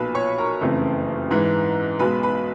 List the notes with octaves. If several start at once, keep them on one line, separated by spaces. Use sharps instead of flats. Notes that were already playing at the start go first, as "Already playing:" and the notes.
Already playing: B1 A#2 F3 B4 B5
C#5 C#6
A#4 A#5
F#1 F2 C#3 E3 A3
G#2 E3 G#3
B1 B2 G#3 B4 B5
B4 B5